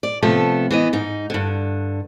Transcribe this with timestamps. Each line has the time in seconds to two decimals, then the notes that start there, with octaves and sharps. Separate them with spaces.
0.03 D5
0.22 C3 F3 A3 B3 A4
0.71 E3 B3 D#5
0.93 G#2 D#4
1.30 G2 D3